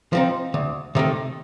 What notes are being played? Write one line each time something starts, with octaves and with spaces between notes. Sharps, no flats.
F3 C4 D#4
D2
C3 D#3 A3